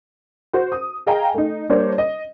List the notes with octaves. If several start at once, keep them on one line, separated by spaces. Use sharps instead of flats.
F#4 C5
D#6
G#4 D#5 F5 G5 G#5 A#5
A3 D#4
G3 A#3 D4 C5 C#5
D#5